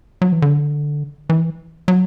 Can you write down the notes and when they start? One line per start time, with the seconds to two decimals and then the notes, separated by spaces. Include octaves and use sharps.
0.22 F#3
0.32 E3
0.42 D3
1.30 E3
1.88 F#3